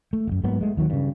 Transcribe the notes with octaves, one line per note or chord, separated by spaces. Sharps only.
A3
D#1 F#2
G#2 F#3 A#3 B3
G#3 A3
D#2 D3 D#3 F#3
G2 C#3